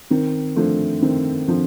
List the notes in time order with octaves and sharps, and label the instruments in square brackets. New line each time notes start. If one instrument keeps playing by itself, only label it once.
[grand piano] D#3 [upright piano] C4
[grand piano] D3 F3 [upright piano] A3
[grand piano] D#3 [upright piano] C4
[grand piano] D3 F3 [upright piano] C4